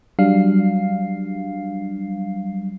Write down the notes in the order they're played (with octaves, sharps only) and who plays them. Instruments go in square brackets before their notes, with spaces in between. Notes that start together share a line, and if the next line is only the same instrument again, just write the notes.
[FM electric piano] F#3 G3 D4 F5 C7